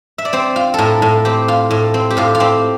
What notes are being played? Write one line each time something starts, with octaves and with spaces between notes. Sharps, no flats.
E5
D5
C4 C5
F4
A2 A4 A#4
A2
C4 G4
F4
A2
C4
G4
A2 F4
F4
C4 G4